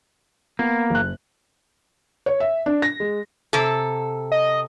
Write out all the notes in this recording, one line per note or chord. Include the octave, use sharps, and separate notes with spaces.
A#3 B3
F#1 F#6
C#5
E5
D4
A#6
G#3
C3 A4
D#5